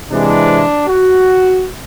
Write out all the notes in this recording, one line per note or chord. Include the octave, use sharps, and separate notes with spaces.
C3 E3 G#3 D4
F#4